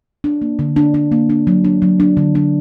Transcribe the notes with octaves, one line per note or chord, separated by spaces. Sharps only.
D4
A#3
D3
D4
D4
A#3
D4
F#3
D4
F#3
D4
D3
D4